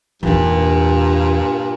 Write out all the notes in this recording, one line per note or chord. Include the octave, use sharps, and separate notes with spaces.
E2 G2 A#2 D#4